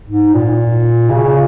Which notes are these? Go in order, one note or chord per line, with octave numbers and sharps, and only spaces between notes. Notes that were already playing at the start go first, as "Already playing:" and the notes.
G#2
A#2
C#3